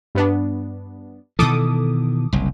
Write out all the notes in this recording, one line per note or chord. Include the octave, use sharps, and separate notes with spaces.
G2 B3 D4
B2 D#3 E3 A4 D6 D#6
F#1 C2